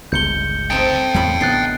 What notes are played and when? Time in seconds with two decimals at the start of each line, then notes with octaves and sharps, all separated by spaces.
0.12 G1 C#2 G#3 G6 C#7 G7
0.70 A3 C4 D#4 G5 A5
1.14 E2 A2 E3 F4 C#5 B5
1.41 A1 D3 B3 D#4 F#6 A6 C7